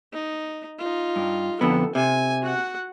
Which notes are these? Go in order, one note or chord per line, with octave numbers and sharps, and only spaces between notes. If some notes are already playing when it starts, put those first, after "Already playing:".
D#4
D#4 F4
G2
F2 D3 B3 A4
C3 G#5
F#4 F#5